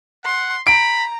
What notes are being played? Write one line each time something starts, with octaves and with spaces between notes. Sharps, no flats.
F#5 C6
A#5 B5 D7